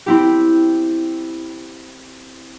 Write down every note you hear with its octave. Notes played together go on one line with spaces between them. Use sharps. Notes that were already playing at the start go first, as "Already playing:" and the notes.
C4 E4 G4